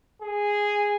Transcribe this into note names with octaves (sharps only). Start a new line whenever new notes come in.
G#4